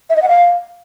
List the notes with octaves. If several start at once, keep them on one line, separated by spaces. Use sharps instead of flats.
E5
D#5
F#5
F5